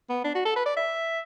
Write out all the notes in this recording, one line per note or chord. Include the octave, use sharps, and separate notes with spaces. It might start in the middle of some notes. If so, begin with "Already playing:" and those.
B3
D4
F#4
A4
B4
D5
E5